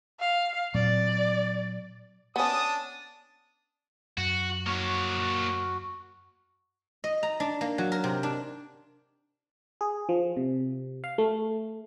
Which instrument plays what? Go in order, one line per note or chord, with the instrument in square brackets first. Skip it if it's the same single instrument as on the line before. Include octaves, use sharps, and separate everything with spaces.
[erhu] F5
[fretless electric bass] A#2 F#3 C4 [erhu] D5
[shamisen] B3 C#4 [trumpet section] D4 A5 D#6
[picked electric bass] F#2 [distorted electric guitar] F#4
[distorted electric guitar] A#3 C#5 [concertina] F#4
[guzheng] D#5
A#5
D4
A#3
F#3
A#4
C3
D4
[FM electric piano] G#4
F3
C3
F5
A3